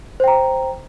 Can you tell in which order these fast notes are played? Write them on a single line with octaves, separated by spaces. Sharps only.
C5 G5 A#5